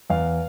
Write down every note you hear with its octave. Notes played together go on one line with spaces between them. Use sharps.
E2 F5